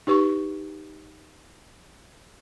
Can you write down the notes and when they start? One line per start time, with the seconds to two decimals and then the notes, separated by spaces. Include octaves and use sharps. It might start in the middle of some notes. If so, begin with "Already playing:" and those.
0.07 D#4 G4 B4 C#6